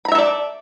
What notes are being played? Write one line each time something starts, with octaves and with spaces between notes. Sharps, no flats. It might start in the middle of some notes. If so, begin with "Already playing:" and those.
A4 D5 E5 A#5 B5